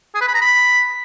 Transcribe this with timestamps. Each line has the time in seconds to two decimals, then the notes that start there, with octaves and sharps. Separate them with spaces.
0.14 G#4
0.21 B4
0.28 B5
0.35 A#5
0.41 B5